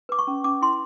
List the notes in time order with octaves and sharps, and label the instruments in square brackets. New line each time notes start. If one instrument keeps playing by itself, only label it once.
[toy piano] B4 D6
C#6
C#4
C#4 D6
E4 C6